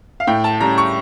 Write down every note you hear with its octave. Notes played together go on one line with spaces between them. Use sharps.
F5
A2 G5
A5
G3 C#4 A#5
C#6